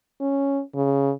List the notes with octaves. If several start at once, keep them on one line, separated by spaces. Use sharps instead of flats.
C#4
C#3